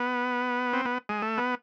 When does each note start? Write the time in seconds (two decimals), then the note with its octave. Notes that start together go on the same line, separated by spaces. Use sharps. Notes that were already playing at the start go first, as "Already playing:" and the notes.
Already playing: B3
0.73 C4
0.85 B3
1.09 G#3
1.22 A3
1.38 B3